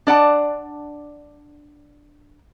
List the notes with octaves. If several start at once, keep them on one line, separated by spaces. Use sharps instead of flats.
D4 D5 F#5 A5